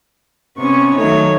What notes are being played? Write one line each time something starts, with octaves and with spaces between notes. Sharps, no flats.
C3 B3 C#4 C#6
D#3 F#3 A3 C#5